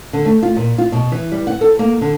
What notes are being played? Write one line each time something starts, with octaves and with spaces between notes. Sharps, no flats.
D3
A3
F4
A#2
F4
B2
E3
G3
F#5
A4
A#3
D3